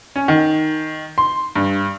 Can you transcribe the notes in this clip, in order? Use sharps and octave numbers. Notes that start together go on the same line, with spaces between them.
C#4
D#3
C6
G2